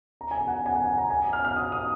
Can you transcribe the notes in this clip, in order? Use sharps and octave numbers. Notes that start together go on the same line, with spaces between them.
A#5
G#5
F#5
G#5
F#5
G#5
A#5
G#5
F6
F6
D#6
D#6